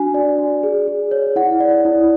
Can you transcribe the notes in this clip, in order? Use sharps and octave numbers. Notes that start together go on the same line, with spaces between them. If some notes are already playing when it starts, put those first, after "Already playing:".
Already playing: D4 F#4 G#5
D5
F#4
G#4
G#4
C#5
E4 F#5
D5
E4